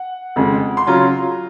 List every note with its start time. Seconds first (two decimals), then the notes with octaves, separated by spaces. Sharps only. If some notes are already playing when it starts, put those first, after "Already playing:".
Already playing: F#5
0.36 F2 C#3 G#3
0.77 C6
0.87 C#3 F#3 C#4 F4 A#5